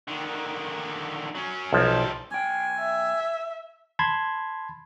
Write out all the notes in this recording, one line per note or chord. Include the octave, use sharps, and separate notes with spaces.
D3 D#3
F#3 C#4
B1 F3 G3 A4
B1 G5 G#5
E5
A5 B5 C6 G#6